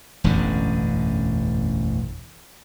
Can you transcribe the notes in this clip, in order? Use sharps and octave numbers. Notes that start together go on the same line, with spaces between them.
E1 A1 F#2 D3